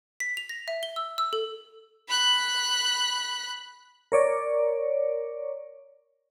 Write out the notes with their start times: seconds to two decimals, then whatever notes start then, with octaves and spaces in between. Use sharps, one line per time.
0.20 B6
0.37 F7
0.49 A#6
0.68 E5
0.83 G7
0.96 E6
1.18 E6
1.33 A4
2.08 B5 F#6
4.12 A#4 C#5 D5